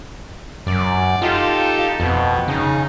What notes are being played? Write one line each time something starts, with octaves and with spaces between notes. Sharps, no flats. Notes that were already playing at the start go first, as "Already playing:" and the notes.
F#2 D5
D#4 F4 G4 A4
F2 B2
C#3 D#4